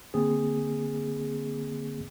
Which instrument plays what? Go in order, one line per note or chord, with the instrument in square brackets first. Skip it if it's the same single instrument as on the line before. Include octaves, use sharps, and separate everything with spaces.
[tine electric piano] D3 A#3 C4 G#4